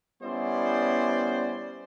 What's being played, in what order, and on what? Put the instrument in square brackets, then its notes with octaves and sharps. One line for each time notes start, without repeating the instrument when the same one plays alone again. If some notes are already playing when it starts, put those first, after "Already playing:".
[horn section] G3 B3 C#4 E4 C5 D5